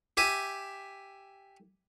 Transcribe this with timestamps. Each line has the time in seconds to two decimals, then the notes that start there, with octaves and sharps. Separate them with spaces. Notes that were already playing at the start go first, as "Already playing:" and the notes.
0.17 G4 E5 G#5